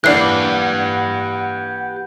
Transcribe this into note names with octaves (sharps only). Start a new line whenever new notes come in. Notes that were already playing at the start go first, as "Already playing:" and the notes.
E3 A#3 D4 G4 B4 F#5 F#6 C7